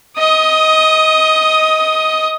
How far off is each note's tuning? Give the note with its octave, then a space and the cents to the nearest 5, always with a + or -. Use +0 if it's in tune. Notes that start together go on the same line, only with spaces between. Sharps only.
D#5 +20 D#6 +0